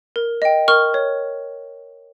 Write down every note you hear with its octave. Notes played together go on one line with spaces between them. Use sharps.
A#4
D#5 G5
A#4 C#6 F6
C#5